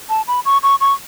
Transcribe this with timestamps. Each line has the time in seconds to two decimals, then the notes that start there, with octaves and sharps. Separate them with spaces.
0.09 A5
0.27 B5
0.45 C#6
0.63 C#6
0.81 C#6